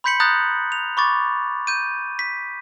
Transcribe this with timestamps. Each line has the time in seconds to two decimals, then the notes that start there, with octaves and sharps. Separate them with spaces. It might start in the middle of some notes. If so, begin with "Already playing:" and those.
0.04 B5 C6 G6 B6 C#7 F#7
0.20 A#5 D#6 F#6 G6 A6 A#6
0.72 F7
0.97 B5 C#6 D6 A6
1.67 G6 D#7
2.19 B6